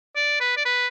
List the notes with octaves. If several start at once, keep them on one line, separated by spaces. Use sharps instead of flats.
D5
B4
D5
B4